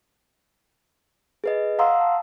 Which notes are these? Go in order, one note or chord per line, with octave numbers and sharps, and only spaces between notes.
G#4 B4 D#5
F5 F#5 A#5 C6 D#6 E6
A5